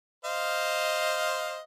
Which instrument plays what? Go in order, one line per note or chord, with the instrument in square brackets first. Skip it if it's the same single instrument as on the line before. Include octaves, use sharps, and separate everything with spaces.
[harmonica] C5 D#5 F5